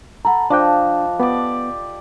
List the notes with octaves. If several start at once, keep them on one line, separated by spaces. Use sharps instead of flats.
A4 F#5 A#5 B5
F3 D4 D#5 G5 A5 D6 F#6
B3 G4 D5